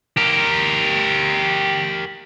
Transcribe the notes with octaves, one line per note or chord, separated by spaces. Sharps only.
G4 A#4